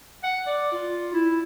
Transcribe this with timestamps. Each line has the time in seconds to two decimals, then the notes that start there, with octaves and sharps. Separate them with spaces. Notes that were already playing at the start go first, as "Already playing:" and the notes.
0.23 F#5
0.46 D5
0.72 F4
1.14 E4